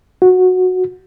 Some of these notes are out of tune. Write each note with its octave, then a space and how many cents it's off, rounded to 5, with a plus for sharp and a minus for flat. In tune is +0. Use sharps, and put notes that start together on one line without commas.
F#4 -10